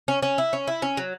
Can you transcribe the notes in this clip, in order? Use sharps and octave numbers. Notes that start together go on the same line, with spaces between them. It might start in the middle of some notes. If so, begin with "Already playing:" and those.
C#4
C#4
E4
C#4
E4
C#4
F#3